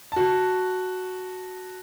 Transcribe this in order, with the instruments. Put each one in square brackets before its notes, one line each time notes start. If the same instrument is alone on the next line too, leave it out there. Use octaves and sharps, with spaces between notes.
[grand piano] F#4 A5